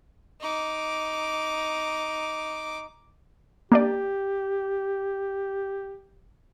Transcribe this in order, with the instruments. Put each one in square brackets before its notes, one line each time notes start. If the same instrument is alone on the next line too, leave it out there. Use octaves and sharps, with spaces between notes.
[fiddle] D#4 D6
[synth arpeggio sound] A#3 D4 D5 [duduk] G4